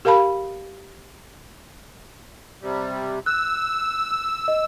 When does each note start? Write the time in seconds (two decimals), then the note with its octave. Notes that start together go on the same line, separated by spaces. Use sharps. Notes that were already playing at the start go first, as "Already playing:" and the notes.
0.05 G4 A#4 F5 A5 B5
2.61 C3 G3
3.26 E6 F#6
4.48 D#5